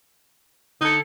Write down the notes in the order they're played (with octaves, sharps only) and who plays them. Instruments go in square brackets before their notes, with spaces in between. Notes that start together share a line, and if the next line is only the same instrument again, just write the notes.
[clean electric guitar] D3 A4 [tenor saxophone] D#4